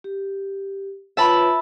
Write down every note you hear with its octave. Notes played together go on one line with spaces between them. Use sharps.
G4
F4 B4 C#5 E5 A5 B5